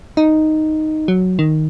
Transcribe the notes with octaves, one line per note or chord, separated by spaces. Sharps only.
D#4
F#3
D#3